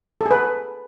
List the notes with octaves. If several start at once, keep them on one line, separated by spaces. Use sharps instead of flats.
A4
G#4
B4